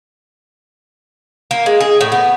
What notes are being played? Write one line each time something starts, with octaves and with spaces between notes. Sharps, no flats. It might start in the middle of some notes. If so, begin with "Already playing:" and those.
A#3
G#3
G#4
A2
B3